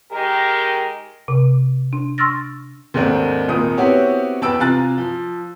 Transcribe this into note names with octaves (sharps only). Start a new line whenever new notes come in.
D#3 G#3 G4 A#4
C3
D4
C6 C#6 E6 F6 A6 A#6
D#2 G#2 A3 C4 D4 A#4
G#1 D#2 A#2 A#4 D#6
B3 C4 E4 F#4 G4 C#5
E2 B4 G5 A5 E6 D7
C3 F4 G#5 A#5 F#6 A6
F3